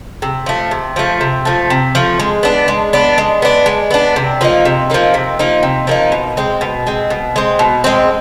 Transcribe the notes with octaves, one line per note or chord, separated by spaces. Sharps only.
C3
F3 A3
C3
F3 A3
C3
F3 A3
C3
F3 A3
G#3
B3 D4
G#3
B3 D4
G#3
B3 D4
G#3
B3 D4
C3
F3 A#3 D#4
C3
F3 A#3 D#4
C3
F3 A#3 D#4
C3
F3 A#3 D#4
B2
G#3 C4
B2
G#3 C4
B2
G#3 C4
B2
G#3 C4